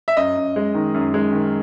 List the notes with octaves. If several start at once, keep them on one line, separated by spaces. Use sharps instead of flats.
E5
F#2 D#5
F#2
G#3
D#3
F#2
G#3
D#3